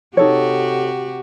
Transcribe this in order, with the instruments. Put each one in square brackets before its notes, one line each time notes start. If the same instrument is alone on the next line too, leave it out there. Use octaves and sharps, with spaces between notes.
[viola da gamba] C3 F#4 G4 [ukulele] D#4 A4 C#5